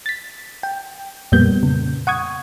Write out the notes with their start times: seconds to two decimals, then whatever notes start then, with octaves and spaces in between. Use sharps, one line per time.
0.06 A6 B6
0.63 G5
1.32 F2 A#2 G3 A#3 B3 G6
1.63 C#3
2.07 F#5 C#6 D#6 G#6